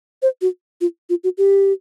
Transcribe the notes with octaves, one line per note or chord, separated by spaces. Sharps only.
C5
F#4
F4
F4
F#4
G4